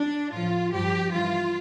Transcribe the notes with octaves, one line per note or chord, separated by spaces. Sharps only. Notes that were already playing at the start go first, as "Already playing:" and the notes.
Already playing: D4
A2 F3 F4
G2 F3 G4
G2 E3 F4